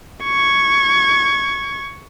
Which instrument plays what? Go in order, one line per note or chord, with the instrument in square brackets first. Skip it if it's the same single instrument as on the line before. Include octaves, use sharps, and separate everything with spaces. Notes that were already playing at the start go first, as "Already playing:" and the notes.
[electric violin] C#6 G#6